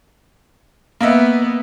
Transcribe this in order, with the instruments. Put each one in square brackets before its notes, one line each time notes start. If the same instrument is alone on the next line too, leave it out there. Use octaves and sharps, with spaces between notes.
[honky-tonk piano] A#3 D#5 E5 [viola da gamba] B3